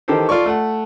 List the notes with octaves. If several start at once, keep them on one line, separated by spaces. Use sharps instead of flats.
D#3 E3 G4 A4 A#4 C5
F4 A4 D5 C#6
A3 F#5